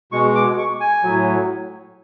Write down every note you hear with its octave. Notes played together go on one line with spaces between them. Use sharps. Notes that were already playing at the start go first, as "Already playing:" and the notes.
B2 G#3 C#6
D6
C#6
G#5
A2 F#3